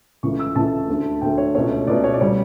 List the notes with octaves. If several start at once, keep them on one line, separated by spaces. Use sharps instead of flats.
C#2 C#3 E3 A3 C#6
E6
C#2 C#3 E3 A3 A5
D2 D3 A3
D2 D3 A3 G5
C#5
C#2 B2 A3 C#5
C#2 B2 A3 D5
C#5
D5
C#3 G3 C#5